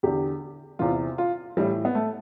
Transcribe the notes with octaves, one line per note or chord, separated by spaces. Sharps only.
E2 D3 G4
E2 C3 E3 F4
F4
A2 E3 G3
B3
A3